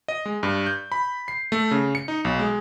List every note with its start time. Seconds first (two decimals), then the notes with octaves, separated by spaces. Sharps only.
0.08 D#5
0.26 G#3
0.43 G2
0.66 G6
0.92 B5
1.28 C7
1.52 A3
1.71 C#3
1.95 C#7
2.08 D#4
2.25 B1
2.39 G#3